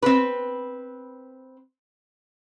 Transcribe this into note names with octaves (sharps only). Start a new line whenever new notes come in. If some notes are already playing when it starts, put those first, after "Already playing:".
C4 B4